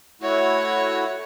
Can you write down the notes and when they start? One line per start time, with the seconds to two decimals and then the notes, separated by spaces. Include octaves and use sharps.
0.22 A3 E4 F#4 C#5